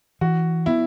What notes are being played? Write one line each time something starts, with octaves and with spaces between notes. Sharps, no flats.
E3 F#4
B3 E4